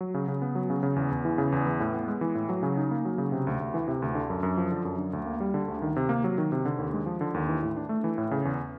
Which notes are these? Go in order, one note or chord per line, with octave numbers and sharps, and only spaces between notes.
F#3
C#3
C#3
B3
F#3
C#3
C#3
E2
E2
E3
C#3
E2
E3
A2
B3
G#3
E3
A2
F#3
C#3
D#4
A#3
F#3
C#3
C3
D2
D2
E3
C3
D2
D3
F#2
F#2
F3
D3
F#2
D3
D2
A#3
G3
D3
D2
D#3
C3
A#3
F#3
D#3
C3
D3
D#2
G#3
F3
D3
D#2
E3
A2
D4
A3
E3
A2
C#3
E2